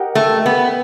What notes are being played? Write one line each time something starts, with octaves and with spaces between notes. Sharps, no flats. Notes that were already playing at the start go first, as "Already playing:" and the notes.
Already playing: G4 A#4 D#5 F#5
A3
B3